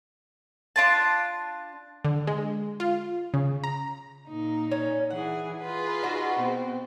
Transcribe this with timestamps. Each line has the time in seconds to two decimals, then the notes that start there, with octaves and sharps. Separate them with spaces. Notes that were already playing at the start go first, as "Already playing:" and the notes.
0.76 D4 F4 A5
2.05 D3
2.27 G#3
2.80 F4
3.34 C#3
3.64 A#5
4.26 A#2 D#4
4.71 C#4
5.10 E3 G#4 F#5
5.60 F4 G#4 B4
6.03 D#4 F#4
6.38 B2 C4